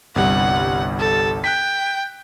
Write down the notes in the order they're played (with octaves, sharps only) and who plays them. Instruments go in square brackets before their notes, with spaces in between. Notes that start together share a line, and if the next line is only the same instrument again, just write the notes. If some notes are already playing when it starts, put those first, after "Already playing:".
[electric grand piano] G1 C2 G3 [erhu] F#5
[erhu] A4
[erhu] G5 [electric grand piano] F#6 B6